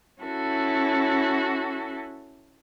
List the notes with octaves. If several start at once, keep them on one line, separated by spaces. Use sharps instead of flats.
C#4 E4 F#4 A4